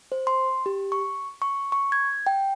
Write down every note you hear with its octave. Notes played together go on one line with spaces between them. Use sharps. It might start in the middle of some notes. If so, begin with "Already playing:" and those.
C5
C6
G4
C#6
C#6
C#6
G#6
G5